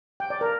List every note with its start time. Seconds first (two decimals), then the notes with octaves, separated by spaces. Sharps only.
0.20 G5
0.30 D5
0.41 A#4